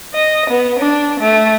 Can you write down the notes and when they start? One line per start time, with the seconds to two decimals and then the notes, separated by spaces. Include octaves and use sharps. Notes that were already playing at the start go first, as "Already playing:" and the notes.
0.15 D#5
0.49 B3
0.78 D4
1.20 A3